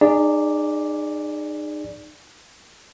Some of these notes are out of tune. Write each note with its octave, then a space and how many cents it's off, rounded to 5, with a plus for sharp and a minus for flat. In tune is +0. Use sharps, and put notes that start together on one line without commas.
D#4 -35 G#4 -10 D5 +0